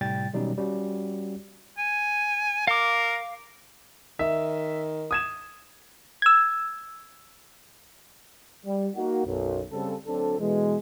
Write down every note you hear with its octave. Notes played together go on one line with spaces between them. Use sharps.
A2 C3 G3 G5 A6
B2 D#3 F#3 G3 C#4 D#4
G3 C#4 F#4
G#5
A#4 F5 D6
D#3 E5
D#6 G#6 E7
E6 G#6
G3
A#3 D#4 F#4
B1 F#2
C#3 G3 C4 A4
D2 F#3 C4 D4 A4
B2 E3 G#3